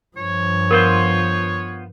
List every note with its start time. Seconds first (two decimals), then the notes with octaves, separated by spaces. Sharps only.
0.17 G2 F3 C#5
0.71 B3 F4 A#4 C5